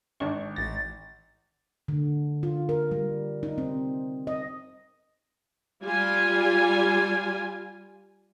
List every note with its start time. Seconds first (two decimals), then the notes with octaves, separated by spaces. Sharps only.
0.20 G#1 D4 C#6
0.56 A1 A6 A#6
1.88 D3
2.43 F4
2.69 A#4
2.91 G3
3.43 D#4
3.58 C4
4.27 D#5
5.83 G3 F4 G#5